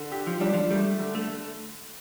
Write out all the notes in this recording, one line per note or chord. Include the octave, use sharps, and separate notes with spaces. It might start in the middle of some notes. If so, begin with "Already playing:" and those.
Already playing: D3
G4
F3
G3 D4
F3
G3 A3
D3
A3